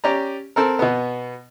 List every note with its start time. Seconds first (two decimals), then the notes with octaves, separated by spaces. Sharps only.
0.04 C#4 G4 D5 A#5
0.56 C4 A4 A#4
0.79 B2 B3